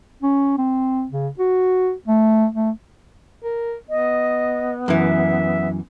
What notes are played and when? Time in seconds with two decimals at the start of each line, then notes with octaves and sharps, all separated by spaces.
0.23 C#4
0.58 C4
1.11 C#3
1.39 F#4
2.08 A3
2.55 A3
3.43 A#4
3.90 B3 D#5
4.88 F#2 E3 E5